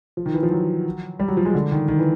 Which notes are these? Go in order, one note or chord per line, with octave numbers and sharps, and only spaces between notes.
F3
D#3
E3
F3
F#3
G3
F#3
F3
G#3
D3
D#3
D#3
E3